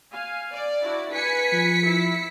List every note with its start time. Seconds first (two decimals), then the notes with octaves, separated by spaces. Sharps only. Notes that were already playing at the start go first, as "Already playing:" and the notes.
0.12 F5 G#5
0.53 D5
0.83 D4 E4 F#4
1.13 B4 G#5 B6 C#7
1.53 F3
1.86 E4